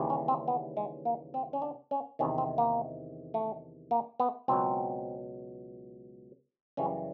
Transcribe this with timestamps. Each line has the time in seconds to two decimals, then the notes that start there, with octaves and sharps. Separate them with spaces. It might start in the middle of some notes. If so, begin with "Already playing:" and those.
Already playing: D#2 C#3 E3 G3
0.10 C#4
0.28 C4
0.48 B3
0.77 G#3
1.05 A#3
1.34 C4
1.53 C#4
1.62 D4
1.91 C#4
2.19 E2 C3 D#3 C#4
2.38 C4
2.58 A#3
3.34 A3
3.91 A#3
4.20 B3
4.48 C#2 B2 F#3 C4
6.77 F#2 C#3 E3 G3 C#4